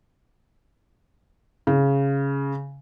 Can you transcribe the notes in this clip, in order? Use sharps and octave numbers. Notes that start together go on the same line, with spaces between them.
C#3